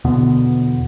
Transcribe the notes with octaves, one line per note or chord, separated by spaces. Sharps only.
E2 B2 D3 B3